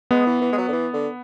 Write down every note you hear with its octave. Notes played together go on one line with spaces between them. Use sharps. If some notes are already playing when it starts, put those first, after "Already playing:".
G#3 B3
E3
E3
G#3
F#3
D3
E3
D3